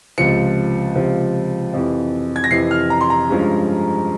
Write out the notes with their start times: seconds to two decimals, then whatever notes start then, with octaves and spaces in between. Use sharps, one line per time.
0.18 C#2 C3 F3 C#7
0.96 C#2 C3 F3
1.74 F2 C3 E3
2.36 G#6
2.44 A#6
2.51 F2 C3 E3 C7
2.71 F6
2.90 A#5
3.01 C6
3.10 A#5
3.29 G2 F3 G#3 C#4